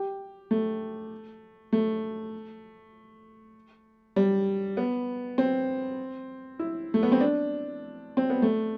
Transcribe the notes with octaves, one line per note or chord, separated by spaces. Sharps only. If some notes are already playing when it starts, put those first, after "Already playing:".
Already playing: G4
A3
A3
G3
B3
C4
E4
A3
B3
C4
D4
C4
B3
A3